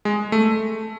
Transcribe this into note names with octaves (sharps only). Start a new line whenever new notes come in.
G#3
A3